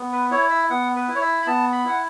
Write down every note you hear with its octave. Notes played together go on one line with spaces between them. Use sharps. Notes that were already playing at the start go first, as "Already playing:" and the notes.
Already playing: B3
B4
E4 C#5
E5
B3 F#5
B4
E4
C#5
E5
B5
B3 A5
B5
E4 F#5